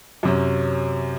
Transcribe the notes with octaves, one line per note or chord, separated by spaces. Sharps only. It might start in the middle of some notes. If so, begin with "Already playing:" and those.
F#2 C3 C#4